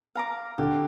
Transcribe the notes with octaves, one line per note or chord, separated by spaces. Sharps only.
F5 A#5 D6
D3 G4